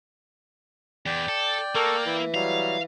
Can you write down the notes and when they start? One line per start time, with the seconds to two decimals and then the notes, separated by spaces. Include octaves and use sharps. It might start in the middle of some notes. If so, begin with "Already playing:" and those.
1.06 E2 D5 G5
1.28 A4
1.75 A#3 A4 A#4 C#6
2.06 E3 E4
2.34 F#3 G3 F5